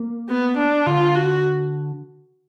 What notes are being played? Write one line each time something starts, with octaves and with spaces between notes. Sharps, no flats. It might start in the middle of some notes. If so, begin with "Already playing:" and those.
Already playing: A#3
B3
D4
D3 F4
F#4